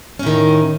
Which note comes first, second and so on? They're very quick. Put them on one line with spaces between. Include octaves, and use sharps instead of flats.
C#4 A2 D#3